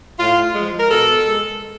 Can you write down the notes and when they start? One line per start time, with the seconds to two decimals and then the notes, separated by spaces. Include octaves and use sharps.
0.17 A2 F4
0.54 F3 G#3
0.79 A#4
0.89 B2 A4
1.25 G#3